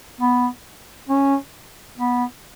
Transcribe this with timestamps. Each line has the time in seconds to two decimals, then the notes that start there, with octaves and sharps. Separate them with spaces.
0.20 B3
1.09 C#4
1.97 B3